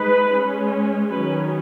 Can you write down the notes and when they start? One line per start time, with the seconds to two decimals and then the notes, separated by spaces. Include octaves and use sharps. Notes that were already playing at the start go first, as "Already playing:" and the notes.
Already playing: G#3 D#4 B4
0.33 G#3 C#4
1.11 D#3 F#3 C#4 B4